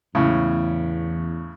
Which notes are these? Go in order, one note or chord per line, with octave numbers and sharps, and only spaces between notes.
E2 A2 C#3